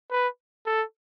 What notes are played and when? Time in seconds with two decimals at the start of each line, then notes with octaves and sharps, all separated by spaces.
0.11 B4
0.66 A4